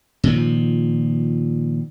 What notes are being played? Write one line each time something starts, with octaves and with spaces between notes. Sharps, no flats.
A#2 D#3 F3